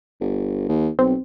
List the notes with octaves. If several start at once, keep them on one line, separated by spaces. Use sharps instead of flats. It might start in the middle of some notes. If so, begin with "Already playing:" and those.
G1
D#2
B1 C4